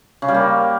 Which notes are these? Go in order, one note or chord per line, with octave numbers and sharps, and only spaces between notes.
C#3
G3
A#3